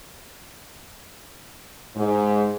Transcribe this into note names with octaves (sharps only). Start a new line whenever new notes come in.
G#2